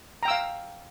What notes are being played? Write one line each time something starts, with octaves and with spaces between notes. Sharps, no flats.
F5 G5 A#5 E6